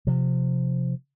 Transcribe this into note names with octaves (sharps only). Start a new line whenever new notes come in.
C3 F3